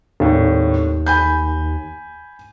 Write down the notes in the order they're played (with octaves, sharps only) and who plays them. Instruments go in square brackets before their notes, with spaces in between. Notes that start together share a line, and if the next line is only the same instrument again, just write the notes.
[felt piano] G#1 A2 [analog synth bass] D#2
[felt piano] G#5 B5 G6